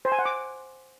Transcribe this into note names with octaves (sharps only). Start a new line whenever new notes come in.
C5
G#5
F#5
D6